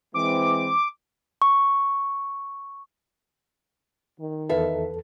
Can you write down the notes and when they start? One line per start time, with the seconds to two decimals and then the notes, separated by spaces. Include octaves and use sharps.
0.14 E3 G#3 C4 D6
1.42 C#6
4.20 D#3
4.49 E2 A4 B4 E5 F5